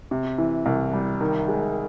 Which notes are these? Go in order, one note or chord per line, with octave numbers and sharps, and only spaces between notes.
C3
E3
C2
G3
D#3
G#3